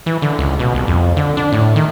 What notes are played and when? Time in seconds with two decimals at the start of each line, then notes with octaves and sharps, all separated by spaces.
0.06 E3
0.22 D3
0.39 C#2
0.59 B2
0.75 C2
0.87 F2
1.17 D3
1.37 D4
1.52 A2
1.76 D#3